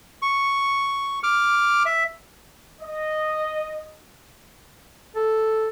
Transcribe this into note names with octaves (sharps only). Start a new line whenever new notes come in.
C#6
D6 F6
E5
D#5
A4